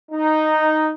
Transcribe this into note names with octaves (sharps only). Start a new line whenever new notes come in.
D#4